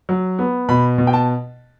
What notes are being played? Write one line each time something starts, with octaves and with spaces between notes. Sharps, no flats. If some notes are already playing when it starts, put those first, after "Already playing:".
F#3
B3
B2 B5
B2
G5
A5